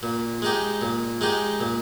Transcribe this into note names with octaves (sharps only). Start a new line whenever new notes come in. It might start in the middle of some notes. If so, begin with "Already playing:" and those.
A#2
G#3 D#4 G4
A#2
G#3 D#4 G4
A#2